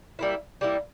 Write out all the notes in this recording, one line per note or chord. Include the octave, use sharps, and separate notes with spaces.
G3 A#3 E4
G3 A#3 E4